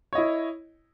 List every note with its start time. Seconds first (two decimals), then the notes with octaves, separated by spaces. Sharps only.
0.13 C#5
0.15 D#5
0.18 E4